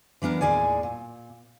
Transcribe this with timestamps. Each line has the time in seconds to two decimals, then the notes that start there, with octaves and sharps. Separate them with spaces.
0.22 E3 B3 D4 A#4
0.41 D#2 A2 G#4 D5 G#5
0.83 A#2